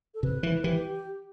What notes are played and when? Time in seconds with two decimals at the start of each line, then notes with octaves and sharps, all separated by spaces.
0.14 A4
0.23 C3 B4
0.43 E3
0.64 E3 G4